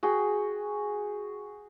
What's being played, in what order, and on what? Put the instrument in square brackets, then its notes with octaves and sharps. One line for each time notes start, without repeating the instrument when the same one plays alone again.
[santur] F#4 G#4 G5